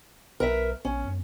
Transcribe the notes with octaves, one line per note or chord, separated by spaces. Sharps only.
B1 A#4 B4 E5
A#1 C#4
F#2